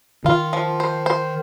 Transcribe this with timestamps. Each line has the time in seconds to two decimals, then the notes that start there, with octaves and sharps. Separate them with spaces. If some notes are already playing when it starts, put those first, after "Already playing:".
0.25 D#3 F4
0.53 F3
0.80 C5
1.06 C5